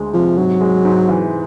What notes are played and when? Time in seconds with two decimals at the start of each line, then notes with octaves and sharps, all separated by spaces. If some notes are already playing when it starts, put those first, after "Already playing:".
Already playing: D2 G#3
0.14 C3 F3
0.37 G#2 F#3
0.61 G#3
0.85 G#2
1.09 E3